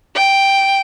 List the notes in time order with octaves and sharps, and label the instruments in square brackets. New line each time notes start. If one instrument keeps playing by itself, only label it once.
[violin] G5